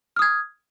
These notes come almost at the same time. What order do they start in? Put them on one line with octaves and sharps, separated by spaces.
F6 D#6 G#6